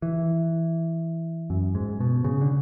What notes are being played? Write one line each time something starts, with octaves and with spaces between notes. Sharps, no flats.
E3
F#2
G#2
B2
C#3
D3